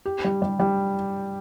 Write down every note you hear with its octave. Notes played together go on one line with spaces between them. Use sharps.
G4
G3
G3
G3